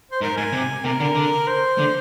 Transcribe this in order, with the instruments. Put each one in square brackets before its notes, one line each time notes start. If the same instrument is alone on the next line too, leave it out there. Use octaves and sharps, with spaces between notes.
[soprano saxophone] C5
[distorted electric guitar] G#2 [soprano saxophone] A#4
[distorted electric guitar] G#2 [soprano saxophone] G#5
[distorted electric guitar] C3
[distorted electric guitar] C3 [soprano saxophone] A#4
[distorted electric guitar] D3
D3
[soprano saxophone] C5
[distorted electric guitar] D3